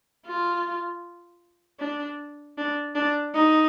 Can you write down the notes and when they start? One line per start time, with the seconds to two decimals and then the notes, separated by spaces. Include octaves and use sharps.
0.27 F4
1.80 D4
2.58 D4
2.95 D4
3.34 D#4